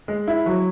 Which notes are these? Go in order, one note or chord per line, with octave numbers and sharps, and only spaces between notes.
G#3
E4
F#3